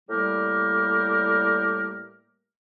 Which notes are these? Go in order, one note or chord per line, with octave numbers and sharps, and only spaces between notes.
A2 G3 A#3 G4 A#4